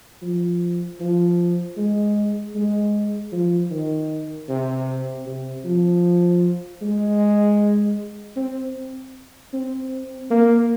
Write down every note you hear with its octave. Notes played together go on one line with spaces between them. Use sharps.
F3
F3
G#3
G#3
F3
D#3
C3
C3
F3
G#3
C4
C4
A#3